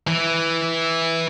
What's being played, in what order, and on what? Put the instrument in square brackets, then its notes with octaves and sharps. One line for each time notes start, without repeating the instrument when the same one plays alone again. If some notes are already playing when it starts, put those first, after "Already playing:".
[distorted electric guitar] E3